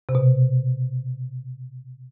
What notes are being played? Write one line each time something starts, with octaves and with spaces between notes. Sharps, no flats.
C3
B2